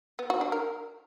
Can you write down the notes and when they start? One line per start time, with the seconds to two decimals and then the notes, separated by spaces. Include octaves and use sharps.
0.19 B3
0.30 F#4
0.41 D4
0.52 A#4